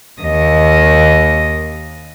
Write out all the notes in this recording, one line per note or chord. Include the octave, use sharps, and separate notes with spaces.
D#2 D#5